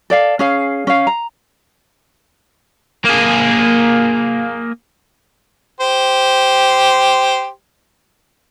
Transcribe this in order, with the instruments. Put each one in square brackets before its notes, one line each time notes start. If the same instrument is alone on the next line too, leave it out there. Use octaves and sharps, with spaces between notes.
[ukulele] A4 D5 F5
C#4 G#4 F5
C#4 F5
A#5
[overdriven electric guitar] A#3 G#4
[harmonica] G4 C5